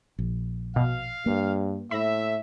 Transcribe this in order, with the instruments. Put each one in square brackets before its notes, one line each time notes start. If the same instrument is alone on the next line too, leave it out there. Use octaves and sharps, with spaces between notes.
[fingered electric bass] A#1
[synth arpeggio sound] B2 [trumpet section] F5
[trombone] G2 [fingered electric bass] A#3
[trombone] A2 [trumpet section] E5 [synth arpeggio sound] B5 A#6